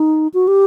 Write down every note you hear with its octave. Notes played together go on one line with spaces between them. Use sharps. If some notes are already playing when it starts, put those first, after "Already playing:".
Already playing: D#4
F#4
G4